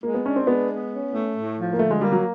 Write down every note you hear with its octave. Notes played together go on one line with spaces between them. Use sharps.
G#3 A#3
B3
C#4 D4
C4
G#3 B3
B3
C#4
A3
A2
F3
A#3
D3 A3
G#3
G3 A#3
F#3